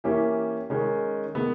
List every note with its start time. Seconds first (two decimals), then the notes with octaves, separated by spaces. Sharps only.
0.04 E3 A#3 C#4 G4
0.70 D#3 G#3 C#4
1.35 D#3 G#3 B3